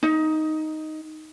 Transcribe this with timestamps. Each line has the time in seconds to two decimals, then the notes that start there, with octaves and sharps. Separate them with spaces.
0.03 D#4